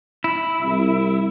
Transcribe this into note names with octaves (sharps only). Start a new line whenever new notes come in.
E4
C2